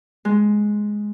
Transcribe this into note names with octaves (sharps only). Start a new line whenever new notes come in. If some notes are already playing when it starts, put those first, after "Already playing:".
G#3